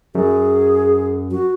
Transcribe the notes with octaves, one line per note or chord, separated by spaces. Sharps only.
F#2 G#4
F#4